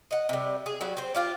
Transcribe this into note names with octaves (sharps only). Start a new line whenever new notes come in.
D#5 F#5
C3 G3
G#4
F#3 G3 F#4
C4 C5
D4 F4 G4